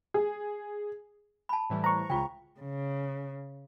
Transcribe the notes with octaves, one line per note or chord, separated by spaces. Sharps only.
G#4
A5 B5
A2 E3 G3
C5 A#5 C#6
C#2 C#3 F4 G5
C#3